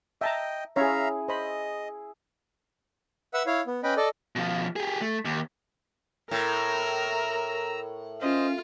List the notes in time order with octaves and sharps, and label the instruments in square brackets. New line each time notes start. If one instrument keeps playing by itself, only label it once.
[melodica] D#5 G5 [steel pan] E5 A5 A#5
[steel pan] C#4 C#5 [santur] E4 G#4 [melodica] E5 F5 A#5
[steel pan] C5 B5 [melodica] D#5
[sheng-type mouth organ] B4 E5 F#5 E6
E4 C#5 F5
B3
C#4 B4 D#5 G5 B5
A4 D5 D#5
[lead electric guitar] B2 F3
G4 G#4
A3
D#2
[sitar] A2 [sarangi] A#4 [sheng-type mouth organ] A#5 E6
[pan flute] C#4 [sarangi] F4 [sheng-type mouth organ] C5 D#5